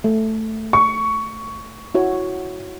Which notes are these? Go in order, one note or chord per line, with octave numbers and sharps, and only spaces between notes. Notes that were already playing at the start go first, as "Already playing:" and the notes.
A3
C#6
E4 F#4 C#5